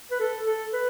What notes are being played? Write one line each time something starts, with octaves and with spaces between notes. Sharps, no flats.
B4
A4
A4
B4